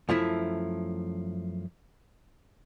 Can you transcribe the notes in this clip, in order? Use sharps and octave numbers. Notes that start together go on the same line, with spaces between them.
F#2 F3 A3 E4